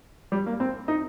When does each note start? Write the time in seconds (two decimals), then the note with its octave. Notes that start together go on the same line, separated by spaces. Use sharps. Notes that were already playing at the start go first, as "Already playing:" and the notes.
0.32 G3
0.46 A#3
0.60 C4
0.88 D#4